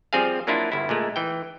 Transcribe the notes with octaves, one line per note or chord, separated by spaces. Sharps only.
F3 G3 C4 G#4 F5
F#3 A#3 D4 E4 F4
G1 E4
A#2 G#3 A3
E3 G5